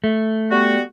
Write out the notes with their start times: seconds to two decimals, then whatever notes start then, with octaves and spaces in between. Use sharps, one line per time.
0.04 A3
0.51 G3 B3 F#4